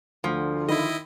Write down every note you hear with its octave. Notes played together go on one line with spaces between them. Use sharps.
D2 D3 F3
D#3 E4 D#5 B5